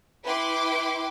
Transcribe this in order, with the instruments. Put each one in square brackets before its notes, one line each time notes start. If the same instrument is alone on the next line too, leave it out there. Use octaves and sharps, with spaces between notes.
[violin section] E4 B4 G5 C6 D6